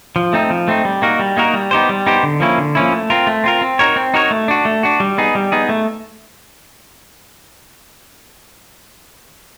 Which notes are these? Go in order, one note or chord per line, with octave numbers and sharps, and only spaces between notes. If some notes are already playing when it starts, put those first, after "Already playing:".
F3
A3 C4 D#4
F3
A3 C4 D#4
G3
A#3 D#4 F#4 A#4
G3
A#3 D#4 F#4 A#4
G3
B3 D#4 G4 C5
G3
B3 D#4 G4 C5
D3
F3 A#3 C#4 E4
D3
F3 A#3 C#4 E4
A3
C4 F4 A#4
A3
C4 F4 A#4
C4
D#4 F#4 A#4 C#5
C4
D#4 F#4 A#4 C#5
A3
D4 F#4
A3
D4 F#4
G3
B3 D#4 G#4
G3
B3 D#4 G#4
A3